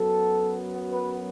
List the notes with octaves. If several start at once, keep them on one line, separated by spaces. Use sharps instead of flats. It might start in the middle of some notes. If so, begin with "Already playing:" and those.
Already playing: F#2 F#3 B3 A4
B4